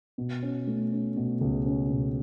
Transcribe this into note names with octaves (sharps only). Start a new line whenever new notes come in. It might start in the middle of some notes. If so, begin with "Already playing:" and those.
B2
C#4
A3
C#4
B2
C#2
C#4
B2